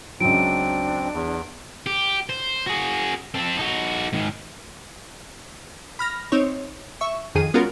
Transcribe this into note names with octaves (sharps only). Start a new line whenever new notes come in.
C#2 F#3 C4 D4 D7
E2
G4
C5
F#4 G#4
C4 A4
D#4 F#4
G#2 D#3
B5 F6 A#6
C4 D#4 C#5
E5 C#6
F2 D#3 G#4 D#7
G#3 B3 C#4 F4 F#4 A#4